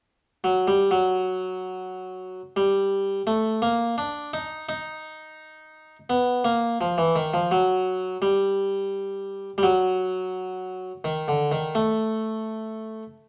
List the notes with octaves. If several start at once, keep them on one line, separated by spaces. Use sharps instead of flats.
F#3
G3
F#3
G3
A3
A#3
D4
D#4
D#4
B3
A#3
F3
E3
D#3
F3
F#3
G3
G3
F#3
D#3
D3
D#3
A3